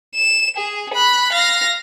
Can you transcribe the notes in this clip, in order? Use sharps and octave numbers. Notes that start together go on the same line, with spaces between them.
E7
G#4
B5 F#6
F5 A#6